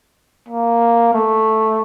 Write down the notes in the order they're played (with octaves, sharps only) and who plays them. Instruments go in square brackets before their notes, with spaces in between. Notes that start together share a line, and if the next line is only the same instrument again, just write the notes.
[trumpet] A#3
A3